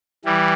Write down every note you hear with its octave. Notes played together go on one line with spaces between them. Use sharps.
E3 G3